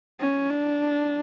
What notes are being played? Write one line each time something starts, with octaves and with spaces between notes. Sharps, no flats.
C#4
D4